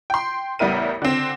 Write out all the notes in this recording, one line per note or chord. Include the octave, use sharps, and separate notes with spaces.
G5 C6
A1 G3 B3 E4 A#4 D#7
D3 C4